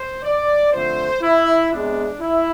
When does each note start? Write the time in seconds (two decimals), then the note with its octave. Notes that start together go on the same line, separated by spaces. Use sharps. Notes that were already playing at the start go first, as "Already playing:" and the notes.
Already playing: C5
0.23 D5
0.72 D3 F3 A3 C4 C5
1.22 E4
1.71 C3 G#3 B3 D4
2.20 E4